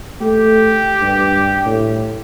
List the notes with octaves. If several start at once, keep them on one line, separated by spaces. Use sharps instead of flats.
A3 G4
G2
A2